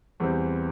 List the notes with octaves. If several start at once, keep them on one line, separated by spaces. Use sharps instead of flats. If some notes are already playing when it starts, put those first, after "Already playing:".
E2 E3 G3 C4